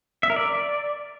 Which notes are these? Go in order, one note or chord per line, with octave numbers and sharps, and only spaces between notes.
E5
A#4
D5